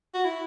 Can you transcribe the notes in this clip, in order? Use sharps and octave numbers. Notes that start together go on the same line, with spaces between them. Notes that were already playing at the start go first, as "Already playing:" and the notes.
F#4
E4